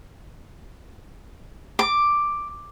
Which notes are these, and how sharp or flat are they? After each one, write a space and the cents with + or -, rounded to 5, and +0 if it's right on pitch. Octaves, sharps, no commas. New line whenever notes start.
D6 +5